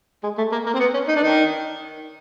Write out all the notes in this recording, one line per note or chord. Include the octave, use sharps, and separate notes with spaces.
G#3
A3
A#3
A#3
C4
B3
C#4
D#4
D4
D#3 D#4